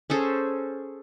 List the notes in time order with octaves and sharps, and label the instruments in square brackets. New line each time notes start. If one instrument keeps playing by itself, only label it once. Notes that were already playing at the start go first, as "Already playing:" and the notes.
[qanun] C#4 G#4 A4 C5